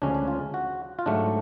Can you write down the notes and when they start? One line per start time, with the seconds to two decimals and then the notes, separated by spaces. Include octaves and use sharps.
0.02 D2 C#3 F3 G#3 C#4 D4
0.15 D4
0.28 F4
0.54 F#4
0.99 F4
1.06 G#2 F#3 A3 D4